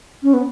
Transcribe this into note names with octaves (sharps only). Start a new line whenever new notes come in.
C#4
B3